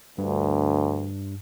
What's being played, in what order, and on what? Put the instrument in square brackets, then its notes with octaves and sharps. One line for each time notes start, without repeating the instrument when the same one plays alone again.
[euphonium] D2 [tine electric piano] G2